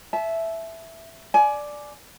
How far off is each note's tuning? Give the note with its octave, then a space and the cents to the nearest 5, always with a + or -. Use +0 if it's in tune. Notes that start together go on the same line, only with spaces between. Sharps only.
E5 +0 A5 -35
D5 +0 G#5 +25